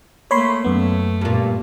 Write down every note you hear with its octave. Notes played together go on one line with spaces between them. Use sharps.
A3 A#3 C#5 B5 C6
F#2 A3 B3
G2 A#2